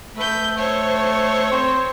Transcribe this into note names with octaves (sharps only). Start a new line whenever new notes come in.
A3 B4 G6
A3 C5 C#5
C4